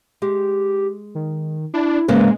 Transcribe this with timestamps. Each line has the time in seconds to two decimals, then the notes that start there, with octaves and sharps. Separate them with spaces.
0.22 G#3 G4
1.15 D#3
1.74 D4 E4
2.08 G#2 C#3 G#3 A#3 B4